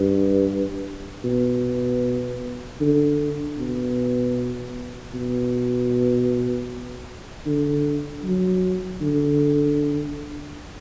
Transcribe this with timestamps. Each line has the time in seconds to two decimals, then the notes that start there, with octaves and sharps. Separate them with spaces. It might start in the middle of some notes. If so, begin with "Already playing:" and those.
Already playing: G2
1.25 B2
2.81 D3
3.58 B2
5.14 B2
7.46 D3
8.24 F#3
9.02 D3